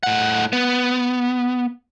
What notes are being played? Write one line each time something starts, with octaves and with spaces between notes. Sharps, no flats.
A2 F#5
B3